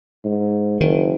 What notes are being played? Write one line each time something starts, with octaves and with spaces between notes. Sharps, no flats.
G#2
F#1 D#3